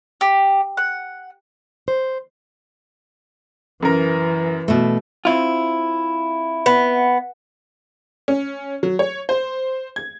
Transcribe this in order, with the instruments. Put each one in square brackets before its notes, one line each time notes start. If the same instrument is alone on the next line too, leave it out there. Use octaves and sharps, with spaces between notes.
[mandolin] G4
F#5
[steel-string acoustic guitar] C5
[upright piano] F#2 A#4 [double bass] E3
[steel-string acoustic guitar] B2 A3
[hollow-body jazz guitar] C4 E4 F4
[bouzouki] B3
[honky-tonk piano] C#4
F#3
C#5
C5
G#6